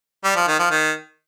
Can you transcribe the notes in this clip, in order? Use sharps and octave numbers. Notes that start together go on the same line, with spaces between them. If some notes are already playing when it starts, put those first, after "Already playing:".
G3
F3
D#3
F3
D#3